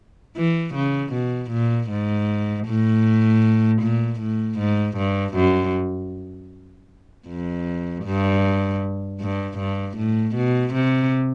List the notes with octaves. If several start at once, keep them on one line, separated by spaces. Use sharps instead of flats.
E3
C#3
B2
A#2
G#2
A2
A#2
A2
G#2
G2
F#2
F2
G2
G2
G2
A2
B2
C3